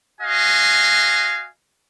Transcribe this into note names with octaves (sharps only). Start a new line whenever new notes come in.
F#4 D#5 F5 G#5